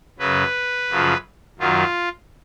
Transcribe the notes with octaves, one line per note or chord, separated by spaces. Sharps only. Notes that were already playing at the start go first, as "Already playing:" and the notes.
F#2 C#3 F#3 B4
F#2 C#3 F3
F#2 D#3 F#3 F4